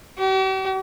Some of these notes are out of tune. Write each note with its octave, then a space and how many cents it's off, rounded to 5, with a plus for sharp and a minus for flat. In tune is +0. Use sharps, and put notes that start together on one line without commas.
G4 -45